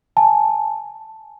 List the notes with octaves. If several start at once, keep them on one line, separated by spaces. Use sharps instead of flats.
G#5 A5